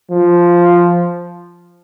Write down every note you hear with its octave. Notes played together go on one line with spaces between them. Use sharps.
F3